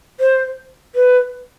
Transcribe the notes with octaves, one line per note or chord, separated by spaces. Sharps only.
C5
B4